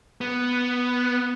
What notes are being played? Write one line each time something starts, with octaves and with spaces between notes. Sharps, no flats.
B3